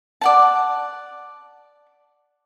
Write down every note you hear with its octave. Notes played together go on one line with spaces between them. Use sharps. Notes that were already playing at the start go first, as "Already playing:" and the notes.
D5 F#5 A5